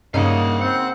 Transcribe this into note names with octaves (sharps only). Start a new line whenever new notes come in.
G2 C#3 A#3 D#4 F5 F#5
C4 F#5